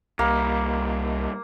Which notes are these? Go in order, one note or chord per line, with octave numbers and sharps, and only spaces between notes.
C2 A#2 G3 A#3